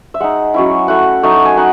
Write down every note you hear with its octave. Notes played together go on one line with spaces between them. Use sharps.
E5
G#3 D#4 F#5
F#3 C#4 E4
A3 E4 F#5
F#3 A3 D#4
G#5
D#4 F#5